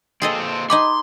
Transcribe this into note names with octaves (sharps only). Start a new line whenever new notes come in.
A#2 C4 G#4 A4 D#5
D#4 G#5 B5 C6 D6